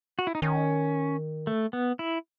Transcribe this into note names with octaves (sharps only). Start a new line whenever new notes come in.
F#4
E4
D#4
D#3 C#4
A3
B3
E4